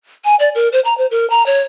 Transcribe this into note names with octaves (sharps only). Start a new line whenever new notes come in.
G#5
D5
A#4
C5
A#5
C5
A#4
A#5
C#5